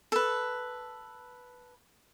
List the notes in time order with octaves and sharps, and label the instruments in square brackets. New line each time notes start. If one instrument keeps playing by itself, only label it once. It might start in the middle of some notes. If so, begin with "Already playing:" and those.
[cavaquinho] A4 B4